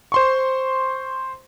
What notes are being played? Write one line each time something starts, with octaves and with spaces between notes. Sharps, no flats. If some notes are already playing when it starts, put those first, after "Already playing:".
C5 C6 C#6